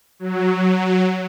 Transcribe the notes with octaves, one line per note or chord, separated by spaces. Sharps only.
F#3